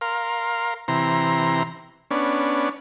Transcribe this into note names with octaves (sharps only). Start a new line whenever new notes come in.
A#4 F5 C6
C3 E3 A#5 C6
B3 C#4 D4